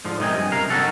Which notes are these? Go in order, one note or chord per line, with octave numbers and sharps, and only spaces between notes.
G#2 D3 F3
B1 C3 D#3 D#5 G#5
G2
F#2 C3 A#4 F5
D#3 F#3 B3 C#4 F#4 A4